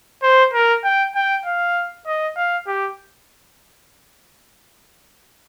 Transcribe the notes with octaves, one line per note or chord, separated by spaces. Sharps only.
C5
A#4
G5
G5
F5
D#5
F5
G4